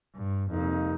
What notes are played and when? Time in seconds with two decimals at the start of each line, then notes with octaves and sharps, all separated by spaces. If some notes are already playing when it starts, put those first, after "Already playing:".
0.15 G2
0.51 F2 C3 G3 A#3 D#4